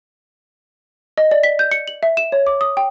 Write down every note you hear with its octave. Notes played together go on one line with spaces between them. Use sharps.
D#5
D5
B6
G6
C#7
F#7
E5
E7
C#5
D6
D#6
G5